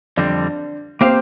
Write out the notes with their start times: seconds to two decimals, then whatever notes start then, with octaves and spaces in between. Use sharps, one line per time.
0.17 F2 D3 G3 C4 D4
1.01 A#3 C4 G4 C5 F5